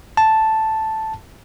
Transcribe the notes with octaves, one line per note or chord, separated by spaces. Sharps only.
A5